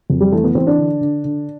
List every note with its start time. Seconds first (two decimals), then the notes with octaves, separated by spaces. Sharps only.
0.10 F2
0.20 G3
0.32 E3 A3
0.44 B3
0.55 E3 C4
0.67 D4
0.78 D3
1.01 D3
1.24 D3